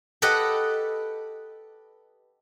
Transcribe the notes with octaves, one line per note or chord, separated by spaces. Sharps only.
G4 A4 B4 D#5 F#5